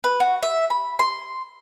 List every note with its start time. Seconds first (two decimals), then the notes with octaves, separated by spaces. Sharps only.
0.04 B4
0.20 F#4
0.43 E5
0.70 B5
0.99 C6